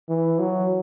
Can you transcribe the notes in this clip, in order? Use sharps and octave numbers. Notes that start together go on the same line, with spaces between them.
E3
F#3